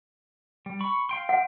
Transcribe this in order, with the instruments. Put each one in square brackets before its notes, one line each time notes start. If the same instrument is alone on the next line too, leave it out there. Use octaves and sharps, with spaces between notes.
[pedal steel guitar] G3
B5 C#6
F5 G5 C6
[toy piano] F#5